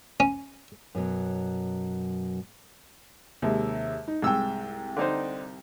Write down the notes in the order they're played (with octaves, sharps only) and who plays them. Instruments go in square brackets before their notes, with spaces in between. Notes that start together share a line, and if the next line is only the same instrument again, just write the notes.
[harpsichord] C#4
[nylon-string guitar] F#2 B2 F#3
[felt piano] D#2 C3 G#3
D#4
[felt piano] C2 G5 [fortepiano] G#2 E6
[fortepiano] D3 D#4 C5